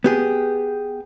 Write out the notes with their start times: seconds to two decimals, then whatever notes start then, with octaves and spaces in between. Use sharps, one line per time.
0.04 B3 G4 G#4